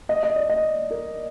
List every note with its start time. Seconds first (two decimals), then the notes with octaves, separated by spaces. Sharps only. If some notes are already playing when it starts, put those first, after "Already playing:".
0.09 D#5
0.23 D#5
0.36 D5
0.49 D#5
0.90 A#4